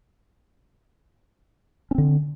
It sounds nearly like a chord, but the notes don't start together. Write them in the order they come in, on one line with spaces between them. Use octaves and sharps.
C#4 C4 D3